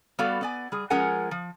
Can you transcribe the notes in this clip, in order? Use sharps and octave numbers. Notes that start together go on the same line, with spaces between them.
G3 B3 F#4 A4 D5 F5
B3 D5 G#5
G3 G#4
F3 G#3 C#4 A#4 F#5 G#5
F3